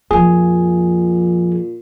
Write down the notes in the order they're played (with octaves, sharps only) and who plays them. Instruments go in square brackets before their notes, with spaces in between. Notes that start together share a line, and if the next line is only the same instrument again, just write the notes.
[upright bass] F2 F3 [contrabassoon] A#2 [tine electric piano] G#4